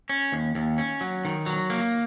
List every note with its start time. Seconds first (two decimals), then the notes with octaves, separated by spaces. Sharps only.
0.09 C#4
0.32 D#2
0.55 D#2
0.78 C#4
1.01 F#3
1.25 D#3
1.46 F#3
1.70 A#3